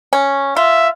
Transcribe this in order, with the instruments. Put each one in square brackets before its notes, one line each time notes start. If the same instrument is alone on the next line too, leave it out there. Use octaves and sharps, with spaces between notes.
[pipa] C#4
[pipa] F4 [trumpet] E5